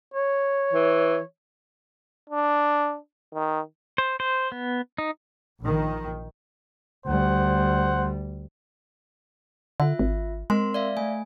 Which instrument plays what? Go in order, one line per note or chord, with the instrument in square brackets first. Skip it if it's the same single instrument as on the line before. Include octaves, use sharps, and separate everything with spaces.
[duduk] C#5
[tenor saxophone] E3
[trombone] D4
D#3
[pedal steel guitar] C5
C5
B3
D#4
[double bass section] A#1 D#3
[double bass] D2 G3 [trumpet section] C5 F#5
[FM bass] D3 [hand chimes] F4 E5
[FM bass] G#1
[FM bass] G#3 [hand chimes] C4 A#4 C6
[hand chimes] D5 E5 F5
A3 G#5